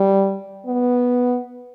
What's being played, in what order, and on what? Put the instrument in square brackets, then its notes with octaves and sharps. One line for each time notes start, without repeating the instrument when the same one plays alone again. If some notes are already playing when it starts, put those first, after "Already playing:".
Already playing: [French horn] G3
B3